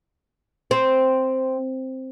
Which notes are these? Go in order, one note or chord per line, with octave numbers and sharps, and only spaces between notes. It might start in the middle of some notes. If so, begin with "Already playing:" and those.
C4